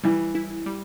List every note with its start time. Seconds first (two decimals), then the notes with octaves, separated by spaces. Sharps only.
0.04 E3 G3
0.35 E4
0.66 G3